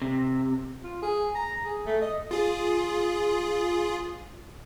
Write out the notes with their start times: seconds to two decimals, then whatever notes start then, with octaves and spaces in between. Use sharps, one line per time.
0.02 C3
0.83 F4
1.02 G#4
1.35 A#5
1.64 G#4
1.86 A3
2.02 D#5
2.31 F4 G#4